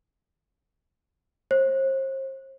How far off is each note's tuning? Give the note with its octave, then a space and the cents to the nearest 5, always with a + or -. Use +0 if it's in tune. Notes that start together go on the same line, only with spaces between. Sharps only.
C5 +40